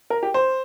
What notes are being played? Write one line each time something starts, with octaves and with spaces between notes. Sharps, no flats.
A#4
G4
C5